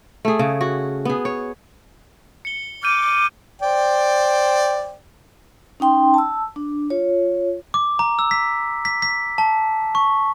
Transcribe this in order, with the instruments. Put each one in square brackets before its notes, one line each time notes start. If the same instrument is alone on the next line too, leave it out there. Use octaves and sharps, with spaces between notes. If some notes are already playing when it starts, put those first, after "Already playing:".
[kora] A3 G#4
C#3
F#4
B3 G#4
C#5
[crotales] C#7 G7
[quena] D6 [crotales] F6 G6 D#7
[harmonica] C5 D5 G5
[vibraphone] C#4 D#4 G5 C6
A5 E6
D4
F4 C#5
[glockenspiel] D6
A#5
E6
B6
B6
B6
A5
C#6